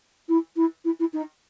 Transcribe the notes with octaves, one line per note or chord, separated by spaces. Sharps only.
E4
E4
E4
E4
D#4